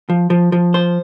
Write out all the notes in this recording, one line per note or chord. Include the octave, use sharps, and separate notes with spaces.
F3
F3
F3
C5